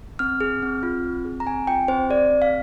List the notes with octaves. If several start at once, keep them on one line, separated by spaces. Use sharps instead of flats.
C4 F6
G#4
C4
F4
C4
G#4
A#5
C4 G#5
F4 G5
C4 C5
G#4 D5
C4
F5